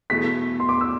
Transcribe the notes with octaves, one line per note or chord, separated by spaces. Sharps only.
E2 B2 A3 E4 B6
C6
D6
E6